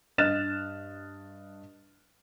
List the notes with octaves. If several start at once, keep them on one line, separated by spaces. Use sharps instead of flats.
G2 D#5 F6 F#6 A6 E7